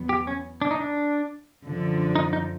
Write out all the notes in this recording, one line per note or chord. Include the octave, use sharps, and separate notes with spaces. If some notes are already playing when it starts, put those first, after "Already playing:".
Already playing: E2 B2 F#3 B3
G4
C#4
D4
D#4
D4
F#2 D3 F3
D#4
D#4